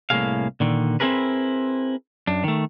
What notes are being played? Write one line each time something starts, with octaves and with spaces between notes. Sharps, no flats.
C2 A2 G#3 A#3 G#4 F5
A#2 D3 D#3
C4 D4 E4 G#4 A#4 B4
F#2 D4
D#3 A3